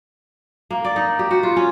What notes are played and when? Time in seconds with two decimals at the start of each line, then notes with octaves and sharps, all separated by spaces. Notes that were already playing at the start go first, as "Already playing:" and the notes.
0.71 A#3
0.85 D5
0.96 D#4
1.19 G4
1.31 F#4
1.43 F4
1.56 C#4